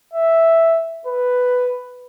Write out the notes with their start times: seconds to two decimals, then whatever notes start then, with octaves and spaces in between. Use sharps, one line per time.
0.14 E5
1.07 B4